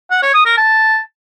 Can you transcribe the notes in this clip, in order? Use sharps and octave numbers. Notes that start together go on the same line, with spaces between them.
F#5
C#5
D#6
A#4
A5